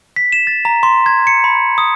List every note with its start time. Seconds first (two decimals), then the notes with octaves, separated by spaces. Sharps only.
0.16 B6
0.32 E7
0.47 A6
0.65 A#5
0.83 C6
1.06 G#6
1.27 C#7
1.44 B5
1.78 D#6